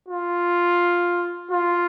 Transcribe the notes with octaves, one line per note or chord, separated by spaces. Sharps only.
F4
F4